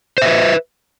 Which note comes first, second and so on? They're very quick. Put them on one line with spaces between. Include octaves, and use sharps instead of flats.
C5 E5 B4